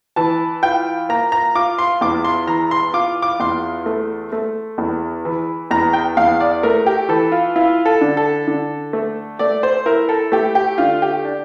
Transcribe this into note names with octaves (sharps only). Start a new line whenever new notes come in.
E3 A5
F4 G5
A#3 A#5
A#5
F4 D6
C6
E2 D6
C6
E3 A#5
C6
F4 D6
D6
E2 C6
A3
A3
E2
E3
E2 A#5
G5
E2 F5
D5
A3 A#4
G4
E3 A4
F4
E4 F4
A4
D3
A4
D3
A3
A3 D5
C5
E4 A#4
A4
A3 G4
G4
D3 F4
G4
D4